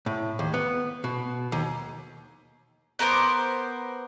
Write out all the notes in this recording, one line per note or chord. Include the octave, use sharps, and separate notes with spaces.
A2
D#2
B3
B2
D#2
B3 A#4 C5 D6